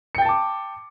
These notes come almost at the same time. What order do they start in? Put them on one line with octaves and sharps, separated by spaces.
C#7 G5 A6 A5 D6